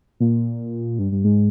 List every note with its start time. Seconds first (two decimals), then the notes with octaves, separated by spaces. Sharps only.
0.20 A#2
0.99 G2
1.12 G2
1.24 G#2